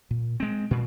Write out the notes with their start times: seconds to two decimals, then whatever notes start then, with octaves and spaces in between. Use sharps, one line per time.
0.11 A#2
0.40 G#3 C4
0.71 A#2